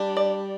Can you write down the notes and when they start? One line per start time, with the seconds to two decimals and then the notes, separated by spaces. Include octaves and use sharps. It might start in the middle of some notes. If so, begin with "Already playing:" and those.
Already playing: G3 D4
0.17 D5